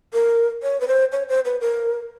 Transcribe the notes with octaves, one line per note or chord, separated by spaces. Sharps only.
A#4
C#5
B4
C5
C#5
C5
B4
A#4